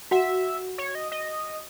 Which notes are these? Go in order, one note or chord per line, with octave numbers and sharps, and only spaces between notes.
F#4 E5 F#5
C#5
D#5
D#5